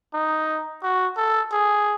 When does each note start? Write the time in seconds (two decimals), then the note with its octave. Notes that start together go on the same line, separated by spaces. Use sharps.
0.13 D#4
0.83 F#4
1.17 A4
1.52 G#4